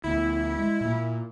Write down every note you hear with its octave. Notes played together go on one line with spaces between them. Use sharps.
D2 B3 E4
G#3
A#2 A#3